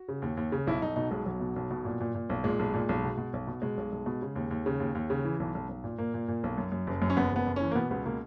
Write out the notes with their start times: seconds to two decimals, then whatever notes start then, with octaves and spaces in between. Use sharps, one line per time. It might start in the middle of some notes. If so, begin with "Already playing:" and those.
Already playing: F#4
0.08 C#3
0.22 D#2
0.37 D#2
0.52 C#3
0.67 B1 E4
0.82 B1 D#4
0.96 B2 D#4
1.11 B1 G#3
1.26 B1 F#3
1.40 B2
1.56 B1
1.71 B2
1.85 A#2
2.00 A#2
2.15 A#2
2.29 B1
2.44 A#2 G#3
2.59 B1
2.74 A#2
2.89 B1
3.04 B2
3.17 B2
3.33 B1
3.47 B2
3.62 B2 G#3
3.77 B1
3.92 B1
4.06 B2
4.22 C#3
4.36 D#2
4.51 D#2
4.66 C#3
4.80 D#2
4.95 D#2
5.10 C#3
5.24 E3
5.40 B1
5.55 B1
5.69 B1
5.84 A#2
5.98 A#2 A#3
6.14 A#2
6.28 A#2
6.43 B1
6.58 F#2
6.72 F#2
6.87 F#1
7.02 F#2
7.10 C#4
7.17 F#1 B3
7.31 F#1 B3
7.46 F#1
7.56 E3 C#4
7.71 A#3
7.75 B2 B3
7.90 C#2 B3
8.06 B2 A#3